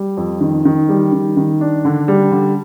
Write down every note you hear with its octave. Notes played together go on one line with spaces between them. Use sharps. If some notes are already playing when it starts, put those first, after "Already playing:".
Already playing: G3
F2
D#3
D#3
G3
D#3
D#3
D4
D3
G3
D3